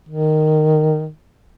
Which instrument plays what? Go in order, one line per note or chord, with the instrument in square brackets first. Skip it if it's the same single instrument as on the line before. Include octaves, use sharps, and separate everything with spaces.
[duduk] D#3